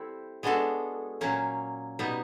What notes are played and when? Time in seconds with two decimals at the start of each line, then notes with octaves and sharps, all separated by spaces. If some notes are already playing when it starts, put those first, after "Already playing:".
Already playing: G3 C4 E4 A4
0.43 G#3 B3 D4 F#4 A4
1.21 A#2 F#3 A#3 C#4
1.99 B2 G3 B3 D#4